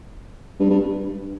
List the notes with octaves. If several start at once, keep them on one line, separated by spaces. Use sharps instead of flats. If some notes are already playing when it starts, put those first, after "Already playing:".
G2
G2